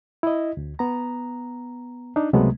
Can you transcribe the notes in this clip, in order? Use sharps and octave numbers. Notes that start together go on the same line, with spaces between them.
E4 D#5
D2
B3 A#5
D4 D#4
C#2 C3 F#3 G#3 A3 B3